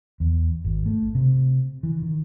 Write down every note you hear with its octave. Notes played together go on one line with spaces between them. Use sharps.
E2
G#1
A3
C3
E3
D#3